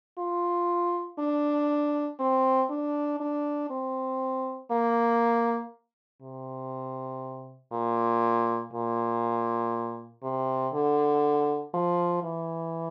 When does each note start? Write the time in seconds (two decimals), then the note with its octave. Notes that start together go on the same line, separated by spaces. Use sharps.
0.19 F4
1.19 D4
2.20 C4
2.70 D4
3.21 D4
3.71 C4
4.72 A#3
6.22 C3
7.72 A#2
8.73 A#2
10.23 C3
10.74 D3
11.74 F3
12.24 E3